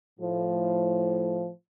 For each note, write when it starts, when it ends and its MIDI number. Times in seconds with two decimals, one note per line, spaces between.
0.20 1.49 45
0.20 1.49 53